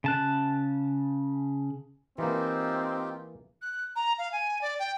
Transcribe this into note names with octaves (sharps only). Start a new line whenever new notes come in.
C#3 A5 F#6
E3 A#3 C4 D#4 F4 G4
F#6
A#5
F5
G#5
D5
G5